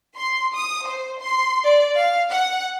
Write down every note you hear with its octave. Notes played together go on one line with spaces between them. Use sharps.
C6
D#6
C5
C6
D5
F5
F#5